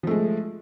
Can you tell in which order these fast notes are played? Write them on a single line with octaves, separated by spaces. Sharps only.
F3 A3 G#3